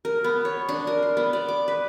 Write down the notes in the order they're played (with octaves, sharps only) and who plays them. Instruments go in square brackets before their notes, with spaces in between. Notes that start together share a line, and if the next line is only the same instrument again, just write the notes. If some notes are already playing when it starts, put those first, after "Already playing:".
[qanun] A#4
B3
C#5
D4
A#4
C6
B3
D5
D6
B4